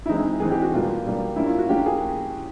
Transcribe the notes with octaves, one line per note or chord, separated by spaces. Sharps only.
E4
E3 G#3 C4 D#4
E3 G#3 C4 G#4
G4
F#4
B2 G3 A#3 F4
B2 G3 A#3
F3 A#3 C#4 E4
F4
F#4
F3 A#3 C#4 G4
G#4